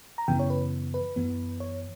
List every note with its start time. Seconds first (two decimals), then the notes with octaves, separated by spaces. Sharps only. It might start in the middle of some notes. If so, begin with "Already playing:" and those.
0.18 A#5
0.28 F#2 C#3 E3 B3 G5
0.39 C#5
0.50 B4
0.94 B4
1.16 F#2 E3 B3
1.60 C#5